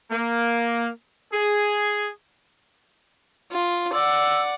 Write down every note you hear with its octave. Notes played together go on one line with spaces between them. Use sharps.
A#3
G#4
F4
D5 F#5 E6